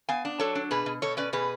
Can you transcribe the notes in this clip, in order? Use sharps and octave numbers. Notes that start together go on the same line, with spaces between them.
B3 F5 G#5
D4
F#3 A4 C#5
D4
B2 G#4 B4
B2
B2 A4 C#5
C#4 B4 D5
B2 G#4 B4